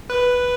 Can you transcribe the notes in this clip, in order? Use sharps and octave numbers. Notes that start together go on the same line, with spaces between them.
B4